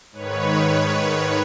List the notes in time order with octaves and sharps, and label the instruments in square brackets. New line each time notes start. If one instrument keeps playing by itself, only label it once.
[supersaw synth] G#2 D#3 B4 C#5